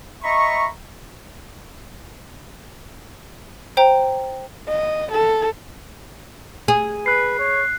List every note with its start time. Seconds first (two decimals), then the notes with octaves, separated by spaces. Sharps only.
0.23 D#5 E5 A#5 B5 C#6
3.77 C5 G5 A#5
4.68 D#5
5.11 A4
6.68 G#4
7.06 B4 F#6 C7
7.39 C#5